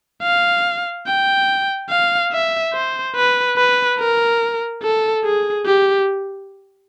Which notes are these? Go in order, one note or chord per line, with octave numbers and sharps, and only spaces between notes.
F5
G5
F5
E5
C5
B4
B4
A#4
A4
G#4
G4